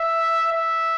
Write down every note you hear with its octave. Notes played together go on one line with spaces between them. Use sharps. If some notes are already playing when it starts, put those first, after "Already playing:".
Already playing: E5
E5